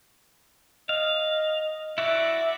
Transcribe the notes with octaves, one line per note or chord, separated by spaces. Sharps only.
D#5 F5
E4 F#4 D5 E5